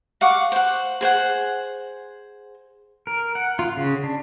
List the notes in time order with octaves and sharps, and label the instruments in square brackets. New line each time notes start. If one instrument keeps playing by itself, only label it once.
[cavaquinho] F5 F#5 C#6 D6
C5 F#5
G#4 C5 F#5
[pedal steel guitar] A#4
F#5
F4
C#3
D4